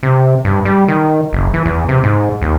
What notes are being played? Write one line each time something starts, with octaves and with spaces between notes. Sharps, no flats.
C3
G2
G3
D#3
F#1
E3
E2
C3
G#2
D#2